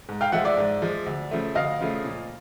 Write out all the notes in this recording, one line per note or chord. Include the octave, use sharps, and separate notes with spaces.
G#2
F5 G5
F3 G#3 E5 F#5
D5 E5
G#2
F3 G#3
D2
C#3 F3 A3
D2 D#5 F5
C#3 F3 A3
A#2